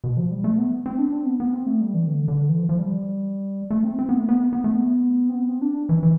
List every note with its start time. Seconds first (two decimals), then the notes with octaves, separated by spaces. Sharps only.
0.04 B2
0.17 F3
0.31 G3
0.44 A3
0.58 B3
0.86 C4
0.99 D4
1.13 C4
1.26 B3
1.40 B3
1.53 C4
1.67 A3
1.81 G3
1.94 E3
2.07 D3
2.28 D3
2.49 E3
2.59 F3
2.69 F3
2.79 G3
3.71 A3
3.84 C4
3.99 C4
4.09 B3
4.19 A3
4.29 B3
4.53 B3
4.64 A3
4.75 B3
5.29 C4
5.34 B3
5.48 C4
5.62 D4
5.89 E3
6.03 E3